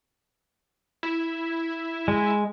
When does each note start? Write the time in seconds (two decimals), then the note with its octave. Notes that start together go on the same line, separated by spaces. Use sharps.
1.03 E4
2.08 G#3